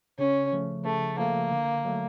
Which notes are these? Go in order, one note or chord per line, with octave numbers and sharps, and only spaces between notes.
C#3 C#4
F3 A3
C#3 A3
F3 A3 A#3
D3
F#3 A3